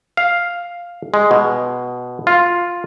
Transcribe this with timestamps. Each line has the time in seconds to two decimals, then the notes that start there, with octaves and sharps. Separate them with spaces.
0.17 F5
1.14 G#3
1.31 B2
2.27 F4